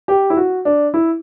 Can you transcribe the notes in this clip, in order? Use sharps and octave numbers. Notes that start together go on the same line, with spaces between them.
G4
E4
F#4
D4
E4